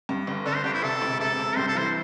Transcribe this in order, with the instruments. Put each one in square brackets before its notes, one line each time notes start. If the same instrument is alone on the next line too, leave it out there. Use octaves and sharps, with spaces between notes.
[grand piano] G2
G1
[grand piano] D3 [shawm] A4
[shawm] C5
[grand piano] G1 [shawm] G4
[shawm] E4
[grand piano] C3 [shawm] A4
[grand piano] E1
[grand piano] C3 [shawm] A4
[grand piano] C3
[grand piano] G2 [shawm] C5
[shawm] A4
[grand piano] E3 [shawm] C5